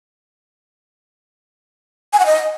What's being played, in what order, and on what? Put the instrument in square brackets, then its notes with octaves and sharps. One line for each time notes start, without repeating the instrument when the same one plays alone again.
[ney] G#5
F#5
D#5